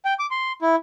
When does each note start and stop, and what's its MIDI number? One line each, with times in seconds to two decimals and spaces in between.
0.05 0.14 79
0.19 0.26 86
0.31 0.52 84
0.62 0.76 64